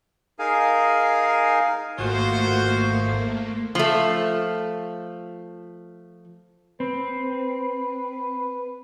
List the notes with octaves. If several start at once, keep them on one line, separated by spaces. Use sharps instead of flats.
D#4 G#4 A#4 F5 G#5
G#1 G#2 A3 A#3 F4 F#4 C5
F3 A3
C4 B4